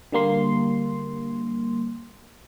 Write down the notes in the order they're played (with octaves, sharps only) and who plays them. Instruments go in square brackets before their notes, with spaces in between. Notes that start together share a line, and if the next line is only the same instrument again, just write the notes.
[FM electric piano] D3 G3 A#3 C6